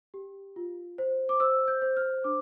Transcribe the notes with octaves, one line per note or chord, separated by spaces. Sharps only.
G4
F4
C5
D6
C5 E6
G6
C5
F6
D4 D6